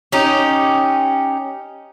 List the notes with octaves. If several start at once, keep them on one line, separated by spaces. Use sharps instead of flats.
C#4 D#4 G4